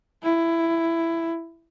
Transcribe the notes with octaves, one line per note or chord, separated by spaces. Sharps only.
E4